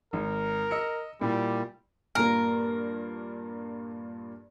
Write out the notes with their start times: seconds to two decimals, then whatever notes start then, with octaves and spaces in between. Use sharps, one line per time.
0.13 G#1 A#4
0.71 D#5 E6 C#7
1.21 A#2 G3 E4
2.15 G2 A#2 A#3 A#4